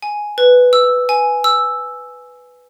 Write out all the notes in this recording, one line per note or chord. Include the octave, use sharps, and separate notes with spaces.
G#5
B4
E6
G#5
E6